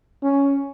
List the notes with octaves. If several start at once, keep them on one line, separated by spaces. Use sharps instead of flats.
C#4